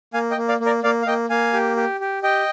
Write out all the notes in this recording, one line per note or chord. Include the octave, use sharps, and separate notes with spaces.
A#3 F5 G#5
D#5 G5
A#3
D5 F5
A#3
A#4 D5
A#3 D5 F5
F5
A#3 D#5 G5
A#3 F5 G#5
G4
G4
G4
G4 D#5 G5